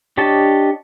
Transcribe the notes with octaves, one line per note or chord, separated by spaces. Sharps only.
D4 G4 C#5 D#5 A5